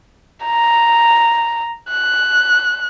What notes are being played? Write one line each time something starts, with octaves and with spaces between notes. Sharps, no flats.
A#5
F#6